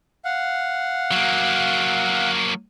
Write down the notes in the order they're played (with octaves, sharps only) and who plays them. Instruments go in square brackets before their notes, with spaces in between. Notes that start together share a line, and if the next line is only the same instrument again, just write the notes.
[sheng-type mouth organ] F5 F#5
[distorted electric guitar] F#3 A#3